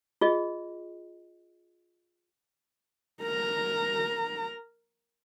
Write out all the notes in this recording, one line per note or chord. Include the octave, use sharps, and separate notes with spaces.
F4 G#4 D#5
A#4 A#5